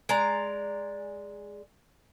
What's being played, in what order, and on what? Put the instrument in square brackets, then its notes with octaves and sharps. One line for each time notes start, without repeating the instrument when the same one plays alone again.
[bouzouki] G#3 D5 A#5